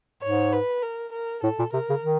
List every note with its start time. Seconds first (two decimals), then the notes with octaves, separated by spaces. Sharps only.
0.23 G#2 C#5
0.53 B4
0.82 A#4
1.13 A#4
1.44 A2 A4
1.59 A#2
1.73 C3 A#4
1.89 C#3
2.03 D#3